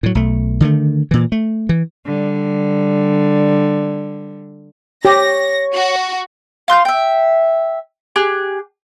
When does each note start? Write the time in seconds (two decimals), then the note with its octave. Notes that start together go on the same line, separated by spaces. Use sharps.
0.03 A2 F#3
0.15 B1 A3
0.60 D3 D#3 G3 A3
1.11 A#2 E3
1.32 A3
1.69 E3
2.05 D3 G3
5.05 G4 C#5 A#6
5.75 F#4
6.68 F5 C6 F#6 G6
6.85 E5 G5
8.16 G4 G#4 F#6